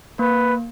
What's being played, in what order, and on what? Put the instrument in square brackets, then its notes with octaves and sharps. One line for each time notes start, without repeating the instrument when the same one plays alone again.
[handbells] A#3 [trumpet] B4